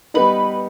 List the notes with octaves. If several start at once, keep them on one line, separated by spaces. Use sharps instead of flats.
G3 B3 D#4 B4